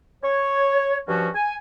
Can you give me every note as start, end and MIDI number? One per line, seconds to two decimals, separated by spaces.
0.24 0.99 73
1.07 1.28 43
1.07 1.28 53
1.07 1.28 61
1.07 1.28 66
1.34 1.54 80